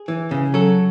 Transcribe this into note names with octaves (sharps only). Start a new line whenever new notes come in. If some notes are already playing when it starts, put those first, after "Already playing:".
Already playing: G#4
E3
C#3
F#3 A4